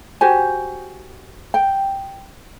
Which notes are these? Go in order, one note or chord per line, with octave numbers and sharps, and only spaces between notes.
F#4 G4 C5 G#5
G5